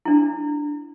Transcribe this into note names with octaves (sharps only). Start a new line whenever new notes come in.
D4 E4